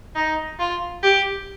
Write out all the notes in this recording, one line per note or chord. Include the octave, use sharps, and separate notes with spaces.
D#4
F4
G4